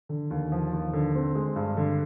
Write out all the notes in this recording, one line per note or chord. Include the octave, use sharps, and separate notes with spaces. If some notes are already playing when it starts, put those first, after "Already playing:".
D3
D#2
F3
D#2
D3
C4
G#3
G2
D3